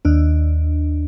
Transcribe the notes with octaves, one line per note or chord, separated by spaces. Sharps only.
D#2 D4